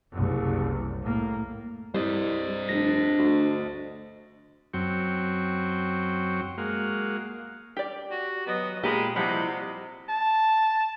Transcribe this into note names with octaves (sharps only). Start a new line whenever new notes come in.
F#1 C2
A2 A#3
C2 G3 C5 D#5
F1 D4 A#6
D2
F#2 F#3 C4 G5 C#6
G#3 A#3 F#4 F5
G4 D5
F#4
F#3 B3 D#5
A#2 G#3 G4 A#4 B5 D#6
C3 F3 G3 E4 D#5 F#5 B5
A5